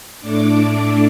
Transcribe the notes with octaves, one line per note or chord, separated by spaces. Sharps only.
A2 A3 D4 D6